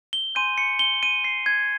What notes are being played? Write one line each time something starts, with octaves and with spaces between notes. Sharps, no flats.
G7
G#5 C6 G6 D#7
C#7
G7
D#7
C7
G#6